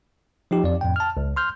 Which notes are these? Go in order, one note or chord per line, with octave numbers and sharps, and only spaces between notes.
F3 D#4 G4
F2 D5
F2 A2 G5
A5 F6
C#2
C6 F6 G6